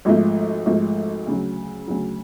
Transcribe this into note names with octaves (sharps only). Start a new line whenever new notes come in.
G#1 G#2 F3 A3
G#1 G#2 F3 A3
D2 C#3 F#3
D2 C#3 F#3